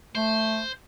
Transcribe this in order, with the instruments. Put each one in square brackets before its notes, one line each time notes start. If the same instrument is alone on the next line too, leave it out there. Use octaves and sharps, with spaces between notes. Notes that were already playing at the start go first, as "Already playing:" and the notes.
[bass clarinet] A3 [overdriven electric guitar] C5